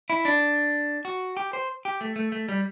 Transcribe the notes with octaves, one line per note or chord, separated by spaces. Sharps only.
E4
D4
F#4
G4
C5
G4
A3
A3
A3
G3